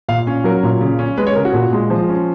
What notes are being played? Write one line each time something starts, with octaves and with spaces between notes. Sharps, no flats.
A#2 F5
C#4
F#3 A#4
A#2
C#3
C#4
G#3 B4
C#5
C#3 A#4
F#4
A#2
G#3
F3
C#4